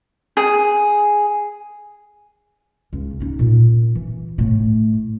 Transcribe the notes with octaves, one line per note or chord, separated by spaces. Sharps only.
G#4
C#2
C#4 D#4
A#2
E3
A2 A3